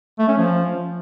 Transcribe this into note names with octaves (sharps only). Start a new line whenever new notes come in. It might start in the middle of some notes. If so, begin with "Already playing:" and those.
A3
C#4
F3